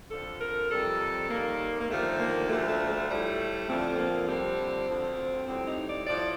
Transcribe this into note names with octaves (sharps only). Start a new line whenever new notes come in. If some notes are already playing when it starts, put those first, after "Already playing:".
F2 D3 F3 A4
A#4
F2 C3 G3 A4
D#2 D#3 G3 A#3
A#3
D#2 D3 F3 A3
A#3
D2 D3 F3 A3
A3
A3
A2 G3
F2 D3 F3 C4
A#3
F2 D3 G3 C4
D2 D3 F3
A2 G3 C4
D#4
D5
A2 F3 D5